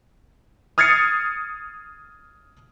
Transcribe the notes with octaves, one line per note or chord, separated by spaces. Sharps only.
D#6 F6 G#6 A6 C7 C#7